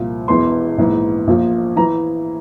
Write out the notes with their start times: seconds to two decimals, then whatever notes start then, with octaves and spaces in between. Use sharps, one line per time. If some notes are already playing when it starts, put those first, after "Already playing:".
Already playing: C2 A#2 F3
0.28 E1 E2 E3 C6
0.78 A#1 G#2 E3
1.27 A#1 A#2 F3
1.76 E3 A#5